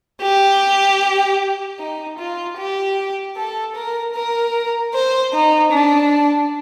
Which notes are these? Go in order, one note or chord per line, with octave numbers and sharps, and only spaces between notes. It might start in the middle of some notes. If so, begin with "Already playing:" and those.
G4
D#4
F4
G4
A4
A#4
A#4
C5
D#4
D4